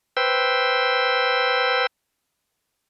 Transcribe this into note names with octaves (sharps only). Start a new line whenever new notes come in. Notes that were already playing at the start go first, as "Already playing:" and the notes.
B4 C5 G5 E6